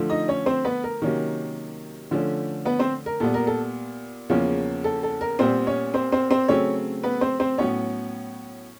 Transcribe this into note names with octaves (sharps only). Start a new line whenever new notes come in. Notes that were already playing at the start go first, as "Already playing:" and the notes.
Already playing: D3 F3 A3
D#4 D#5
C#4 C#5
C4 C5
B3 B4
A#4
C3 D#3 F#3 A#3 C#4
D3 F3 A3 C#4
B3 B4
C4 C5
A#4
A#2 G3 B3 A4
A#4
A4
E2 C#3 F3 A#3 C#4
A4
A4
A#4
A#2 G3 B3 C4 C5
C#4 C#5
C4 C5
C4 C5
C4 C5
C#3 F#3 A3 C4 C#4 C#5
B3 B4
C4 C5
C4 C5
A2 F#3 B3 C#4 C#5